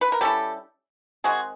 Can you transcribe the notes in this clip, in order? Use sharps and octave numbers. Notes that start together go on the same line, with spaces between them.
B4
A#4
G3 A#3 C#4 E4 G4 A4
D#3 G#3 C4 F#4 G#4